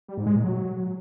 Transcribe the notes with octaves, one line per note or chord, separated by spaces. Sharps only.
G3
G#2
G#3
A#2
F#3